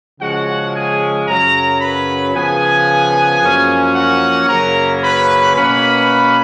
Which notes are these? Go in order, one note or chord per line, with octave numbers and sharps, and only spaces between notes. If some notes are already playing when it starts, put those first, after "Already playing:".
C#3 F3 G#3 C#4 F#4 F#5
G#4 G#5
F#2 C#3 F#3 C#4 A#4 A#5
B4 B5
C#3 F3 B3 G#4 G#5
F#2 F3 A#3 C#4
F#4 F#5
F#2 C#3 F#3 A#3 C#4 A#4 A#5
B4 B5
B2 A#3 C#4 B4 B5